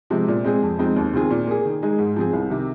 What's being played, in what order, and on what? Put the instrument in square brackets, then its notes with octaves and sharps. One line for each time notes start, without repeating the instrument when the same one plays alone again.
[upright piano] C3 F3 G#3 C4
A#2
G#3 C4 G#4
F2
F3 G#3 C4 D#4
D#2
D#3 C4 F4 G#4
A#2
A#3 G#4
D#3
G#3 D#4 G#4
G#2
F3 C4 G#4
C2
C3 D#3